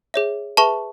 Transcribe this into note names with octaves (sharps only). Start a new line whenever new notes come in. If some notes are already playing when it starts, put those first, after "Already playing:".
G#4 C#5 E5
G#4 B4 E5 A5 C#6